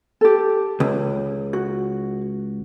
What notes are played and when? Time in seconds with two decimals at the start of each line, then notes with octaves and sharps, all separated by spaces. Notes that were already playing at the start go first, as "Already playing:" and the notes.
0.21 G4 A4
0.80 C#2
1.53 F#4